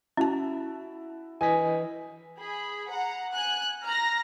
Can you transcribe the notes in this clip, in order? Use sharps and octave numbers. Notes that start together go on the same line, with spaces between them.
C#4 E4 F#4 A5
E3 D#5 G#5 B6
G#4 B5
F#5 A#5
G#5 F#6
A#5 F6 A#6